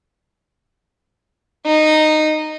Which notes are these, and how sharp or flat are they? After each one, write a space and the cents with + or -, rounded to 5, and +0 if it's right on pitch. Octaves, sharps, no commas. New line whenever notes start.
D#4 -15